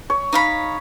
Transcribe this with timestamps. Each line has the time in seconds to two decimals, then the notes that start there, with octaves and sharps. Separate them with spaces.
0.10 C#5
0.33 D#4 F5 B5